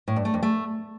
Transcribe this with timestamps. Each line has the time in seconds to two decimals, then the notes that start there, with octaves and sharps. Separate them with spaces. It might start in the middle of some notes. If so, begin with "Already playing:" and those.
0.08 A2
0.16 G2
0.25 A3
0.34 F2
0.43 A3